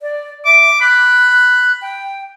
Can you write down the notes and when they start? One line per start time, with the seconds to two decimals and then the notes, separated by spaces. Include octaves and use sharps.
0.02 D5
0.45 E5 D6
0.81 B5 F#6
1.82 G5